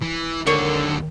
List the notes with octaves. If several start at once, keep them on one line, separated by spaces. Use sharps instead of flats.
E3
D#2 D3 A4 A#4 C#5